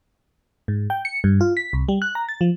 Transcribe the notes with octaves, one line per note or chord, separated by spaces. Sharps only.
G#2
G5
C#7
G2
F4
B6
C2
G3
F#6
A#5
A6
F3